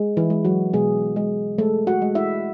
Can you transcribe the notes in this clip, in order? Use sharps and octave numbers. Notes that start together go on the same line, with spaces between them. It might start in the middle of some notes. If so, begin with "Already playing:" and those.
Already playing: G#3
E3 E4
G#3
F#3 F#4
B2 G#3 G#4
G#3
G#3 A3 A4
F#4 F#5
G#3
E4 E5